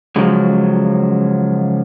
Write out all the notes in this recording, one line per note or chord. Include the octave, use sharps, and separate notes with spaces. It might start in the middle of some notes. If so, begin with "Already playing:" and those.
C#3 F3 F#3 G#3